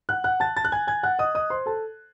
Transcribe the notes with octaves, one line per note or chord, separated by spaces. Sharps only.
F#5 F#6
F#5 F#6
A5 A6
A5 A6
F#6
G#5 G#6
G#5 G#6
F#5 F#6
D#5 D#6
D#5 D#6
C5 C6
A4 A5